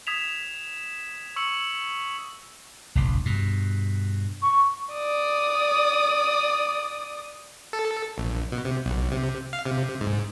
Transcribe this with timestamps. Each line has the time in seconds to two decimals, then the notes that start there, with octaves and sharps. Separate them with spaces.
0.07 D#6 G#6 B6 E7 F7
1.36 C#6 E6 C#7 F#7
2.95 F1 A#1 D#2
3.25 G2 B2
4.42 C#6
4.94 D5 D#6
7.73 A4
8.18 A#1
8.52 B2
8.65 C3
8.85 B1
9.11 C3
9.53 F5
9.65 C3
10.01 G#2